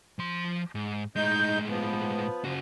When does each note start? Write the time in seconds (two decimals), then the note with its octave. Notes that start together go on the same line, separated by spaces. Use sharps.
0.19 F3 C6
0.75 G#2
1.16 A2 G#3 D#4 G6
1.69 F3 B3
2.45 C#3 F3 F#4